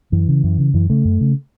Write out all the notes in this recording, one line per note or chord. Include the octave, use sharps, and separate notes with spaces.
F#2 E3
C#3
F#2
C#3
F#2 E3
C#3 A3
F#2
C#3